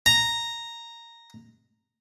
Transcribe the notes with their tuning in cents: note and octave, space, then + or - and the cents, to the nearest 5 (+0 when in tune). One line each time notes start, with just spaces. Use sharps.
A#5 -5